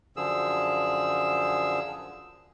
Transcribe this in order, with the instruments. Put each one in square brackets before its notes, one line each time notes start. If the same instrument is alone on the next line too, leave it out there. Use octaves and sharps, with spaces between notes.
[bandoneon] F#2 D3 F3 G#4 E6